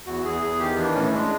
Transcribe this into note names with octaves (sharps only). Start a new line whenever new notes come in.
E2 F#4
E2 G#4
E2 G#4
D#3 G4
E3 D4
A2 C#4
G#3 D4